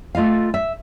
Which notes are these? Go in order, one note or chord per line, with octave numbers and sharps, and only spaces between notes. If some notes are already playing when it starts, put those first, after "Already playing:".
A3 F4 D#5 F5
E5